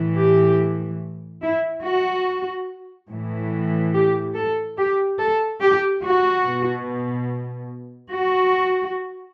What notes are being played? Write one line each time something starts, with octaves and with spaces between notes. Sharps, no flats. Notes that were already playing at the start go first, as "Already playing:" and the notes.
Already playing: A2 E3
G4
E4
F#4
A2 E3
G4
A4
G4
A4
G4
F#4
B2
F#4